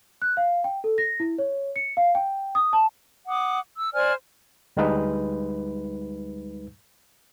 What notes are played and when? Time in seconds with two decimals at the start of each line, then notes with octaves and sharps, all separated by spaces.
0.22 F#6
0.37 F5
0.64 G5
0.84 A4
0.98 A#6
1.20 E4
1.38 C#5
1.76 C#7
1.97 F5
2.15 G5
2.55 D#6
2.73 A5
3.28 F#5 D6 D#6
3.77 E6
3.93 C5 D5 G#5 F6
4.77 D2 G3 G#3 D#4 B4